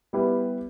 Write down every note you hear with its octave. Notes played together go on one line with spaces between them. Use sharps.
G3 B3 E4 G4 B4